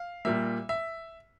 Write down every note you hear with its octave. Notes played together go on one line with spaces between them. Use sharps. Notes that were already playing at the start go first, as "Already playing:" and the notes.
Already playing: F5
A#2 G3 A#3 E5
E5